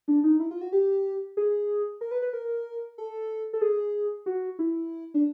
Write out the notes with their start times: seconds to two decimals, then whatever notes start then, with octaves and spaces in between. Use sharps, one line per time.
0.08 D4
0.24 D#4
0.40 E4
0.51 F4
0.61 F#4
0.72 G4
1.37 G#4
2.01 A#4
2.11 B4
2.22 B4
2.33 A#4
2.98 A4
3.53 A4
3.61 G#4
4.26 F#4
4.59 E4
5.14 D4